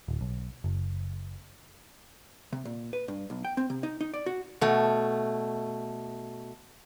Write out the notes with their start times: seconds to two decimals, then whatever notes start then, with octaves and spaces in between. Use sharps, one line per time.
0.08 D1
0.21 B1
0.64 F#1
2.53 C3
2.65 A#2
2.93 B4
3.08 G2
3.30 B1
3.45 G5
3.57 C4
3.70 C3
3.83 D#4
4.01 D#4
4.14 D5
4.26 F#4
4.61 B2 A3